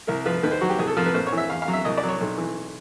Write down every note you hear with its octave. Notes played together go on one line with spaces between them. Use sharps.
C2 A#4
F3 B4
D#2 B4
C5
F#3 F#4
G4
C2 G#4
A4
F3 A#4
B4
A#1 C5
C#5
E3
E5
E2 F5
F5
F#3
E5
C2 D#5
D5
F#3
C#5
B1
E3